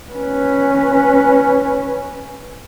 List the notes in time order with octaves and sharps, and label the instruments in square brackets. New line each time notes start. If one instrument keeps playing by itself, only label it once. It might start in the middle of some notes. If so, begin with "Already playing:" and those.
[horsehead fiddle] C#4 B4